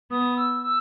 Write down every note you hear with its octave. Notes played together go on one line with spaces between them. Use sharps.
B3 D#6
E6
E6